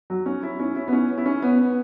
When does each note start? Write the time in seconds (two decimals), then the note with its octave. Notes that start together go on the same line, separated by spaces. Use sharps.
0.10 F#3
0.26 C#4
0.43 E4
0.60 C#4
0.76 E4
0.88 B3
0.93 C#4
1.18 E4
1.26 C#4
1.42 B3
1.59 B3